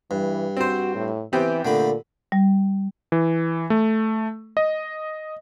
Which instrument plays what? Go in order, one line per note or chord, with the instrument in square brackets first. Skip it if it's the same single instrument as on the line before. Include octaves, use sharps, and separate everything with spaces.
[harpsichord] G2 [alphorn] E3
[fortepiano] C4 C5 [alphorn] F#4
[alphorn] A2
[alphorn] E3 [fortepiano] B3 C4 G4
[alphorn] A#2 [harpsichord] D3 A3 B5
[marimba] G3
[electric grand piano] E3
A3
D#5